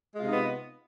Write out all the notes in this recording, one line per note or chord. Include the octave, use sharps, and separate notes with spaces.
C3 G#3 B3 D#4 F4